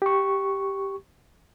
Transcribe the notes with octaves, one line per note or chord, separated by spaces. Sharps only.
G4 C#6